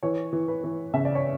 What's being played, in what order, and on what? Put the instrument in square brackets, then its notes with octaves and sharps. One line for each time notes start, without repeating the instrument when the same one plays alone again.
[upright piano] E3 C#5
E3
B4
E3
C#3 E5
D5
C#5